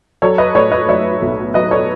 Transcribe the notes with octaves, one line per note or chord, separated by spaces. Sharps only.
F#3 A4 C#5
B4 D#5
A2 A4 C#5
B4 D#5
F#3 C#5 E5
B1
F#3 B4 D#5
A4 C#5